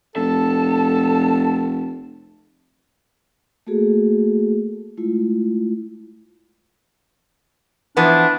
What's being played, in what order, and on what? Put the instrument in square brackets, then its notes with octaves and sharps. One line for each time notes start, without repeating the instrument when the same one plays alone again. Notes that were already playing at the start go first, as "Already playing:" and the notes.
[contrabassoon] F1 [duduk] A4 [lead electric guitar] A5
[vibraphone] A3 A#3 F#4 G#4 A4
G#3 A3 E4 F4
[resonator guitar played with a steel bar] E3 F3 B3 [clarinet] D4